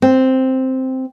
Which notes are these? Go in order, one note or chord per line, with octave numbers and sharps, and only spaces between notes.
C4